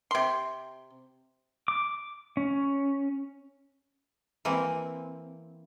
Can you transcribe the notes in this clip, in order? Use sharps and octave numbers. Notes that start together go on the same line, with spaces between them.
C3 C6
D6
C#4
E3 A#3 C4